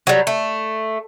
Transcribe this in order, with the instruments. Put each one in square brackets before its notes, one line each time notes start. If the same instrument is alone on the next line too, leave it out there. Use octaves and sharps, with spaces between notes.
[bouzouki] F#3 G3
A3